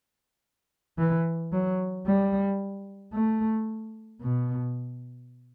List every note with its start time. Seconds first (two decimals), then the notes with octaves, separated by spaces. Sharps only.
0.98 E3
1.52 F#3
2.06 G3
3.13 A3
4.21 B2